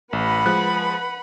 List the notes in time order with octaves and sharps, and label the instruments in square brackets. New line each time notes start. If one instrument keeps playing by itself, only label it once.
[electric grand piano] A1 [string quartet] B4 F#5 B5
[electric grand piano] F3 G#3 F#6